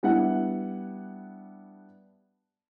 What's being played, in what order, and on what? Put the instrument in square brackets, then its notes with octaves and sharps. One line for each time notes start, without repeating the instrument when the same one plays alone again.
[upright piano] G3 B3 D4 E4 F#5